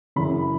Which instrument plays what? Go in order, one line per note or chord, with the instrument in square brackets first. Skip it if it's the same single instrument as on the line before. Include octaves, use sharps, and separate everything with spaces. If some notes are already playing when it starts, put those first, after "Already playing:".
[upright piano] F#2 C#3 E3 B5